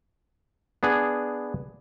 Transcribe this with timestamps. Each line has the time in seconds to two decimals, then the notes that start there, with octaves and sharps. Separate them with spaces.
0.83 B3 D4 G#4